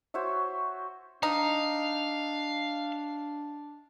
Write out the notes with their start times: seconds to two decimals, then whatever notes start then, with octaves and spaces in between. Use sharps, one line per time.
0.14 F#4 C5 C#5 E5
1.23 D4 D#4 F5